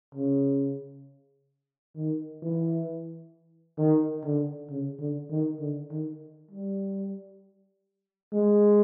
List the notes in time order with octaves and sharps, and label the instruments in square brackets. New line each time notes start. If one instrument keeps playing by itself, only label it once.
[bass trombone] C#3
D#3
E3
D#3
D3
C#3
D3
D#3
D3
D#3
G3
G#3